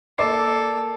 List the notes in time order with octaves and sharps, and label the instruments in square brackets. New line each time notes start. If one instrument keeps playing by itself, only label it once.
[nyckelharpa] A#3 A4 [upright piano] D5 D6 C7